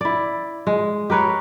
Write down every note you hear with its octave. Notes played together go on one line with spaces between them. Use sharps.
E4 D5
G#3
G4 A#4 B4 C#5